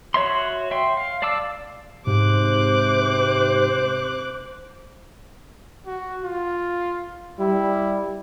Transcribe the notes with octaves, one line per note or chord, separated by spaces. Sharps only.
F#4 C#5 E5 C6
E5 G5 C6
F5
D5 F5 A5 D6 E6
G#2 C3 C5 D6 F#6
F#4
F4
G3 E4